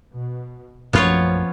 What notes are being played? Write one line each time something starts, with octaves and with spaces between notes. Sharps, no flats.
B2
A#1 F#2 F3 A3 B3 C#4 F4 C#5